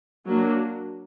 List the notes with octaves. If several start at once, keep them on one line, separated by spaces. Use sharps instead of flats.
F#3 A#3 D4